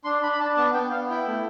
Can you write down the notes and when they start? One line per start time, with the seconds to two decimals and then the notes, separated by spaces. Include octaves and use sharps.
0.04 D4 C6
0.22 D4 B5
0.32 B5
0.40 D4 A5
0.57 B3 A5
0.74 B3 G5
0.91 B3 F5
1.09 E4 G5
1.27 A3